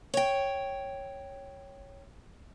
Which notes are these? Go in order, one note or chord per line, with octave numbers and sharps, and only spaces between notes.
C#5 G5